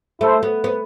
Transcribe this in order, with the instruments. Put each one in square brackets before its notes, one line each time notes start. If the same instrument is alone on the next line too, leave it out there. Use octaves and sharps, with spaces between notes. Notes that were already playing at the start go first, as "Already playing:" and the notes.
[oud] A3 [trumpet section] E4 A4 C5
[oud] B3
B3